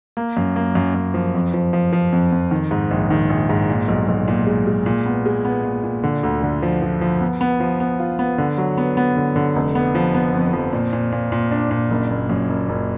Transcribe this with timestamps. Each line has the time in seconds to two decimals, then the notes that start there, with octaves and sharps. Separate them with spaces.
0.17 A#3
0.37 F#2
0.56 A#3
0.75 F#2
0.95 F#2
1.14 F3
1.34 F2
1.53 F3
1.73 F3
1.93 F3
2.12 F2
2.32 F2
2.51 D#3
2.71 G#2
2.91 A#1
3.10 D#3
3.30 A#1
3.49 G#2
3.69 A#2
3.88 B1
4.08 B1
4.28 A#2
4.47 G#3
4.67 G#3
4.86 A#2
5.06 B3
5.26 G#3
5.45 B3
5.64 A#2
5.84 A#2
6.03 D3
6.23 D2
6.43 D3
6.62 F3
6.82 F3
7.01 F3
7.21 B3
7.41 B3
7.60 F3
7.80 B3
7.99 F4
8.19 B3
8.38 D3
8.58 F#3
8.77 B3
8.97 B3
9.17 D3
9.36 D3
9.56 F1
9.75 B3
9.95 F3
10.14 B3
10.34 F2
10.53 F3
10.73 A#2
10.93 A#2
11.12 A#2
11.32 A#2
11.51 D4
11.71 A#2
11.90 F#1
12.10 F#1
12.29 F#2
12.49 F#1
12.69 F#1